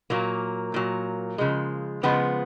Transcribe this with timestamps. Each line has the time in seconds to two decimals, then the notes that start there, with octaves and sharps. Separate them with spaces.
0.10 A#2 F#3 A#3
0.74 A#2 F#3
1.38 C#3 F3 G#3
2.03 C#3 F3 G#3 B3